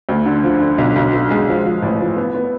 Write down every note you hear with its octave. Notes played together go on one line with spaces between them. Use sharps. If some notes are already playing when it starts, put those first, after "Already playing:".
D2
D3
F3
D3
B1
B1
B2
G#3
F3
F3
A1
F3
B3
B3